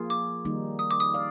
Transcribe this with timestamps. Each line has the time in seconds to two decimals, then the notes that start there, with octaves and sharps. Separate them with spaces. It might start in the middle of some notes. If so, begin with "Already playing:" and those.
Already playing: F3 A#3 F4 G#4
0.10 D6
0.45 D#3 G3 A#3 D#4
0.79 D#6
0.91 D6
1.00 D#6
1.14 D5 F5